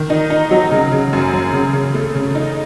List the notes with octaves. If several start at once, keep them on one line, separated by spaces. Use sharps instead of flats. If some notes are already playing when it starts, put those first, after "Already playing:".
Already playing: D#3
D#4
D#4
F#3
C#3
C#3
F#2
F#2
C#3
C#3
A3
C#3
D#4